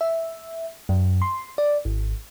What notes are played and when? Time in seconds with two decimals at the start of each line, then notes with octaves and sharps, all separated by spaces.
0.01 E5
0.89 F#2
1.22 C6
1.58 D5
1.85 G#1